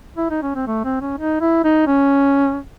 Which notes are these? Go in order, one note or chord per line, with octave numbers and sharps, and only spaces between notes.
E4
D#4
C#4
C4
A3
C4
C#4
D#4
E4
D#4
C#4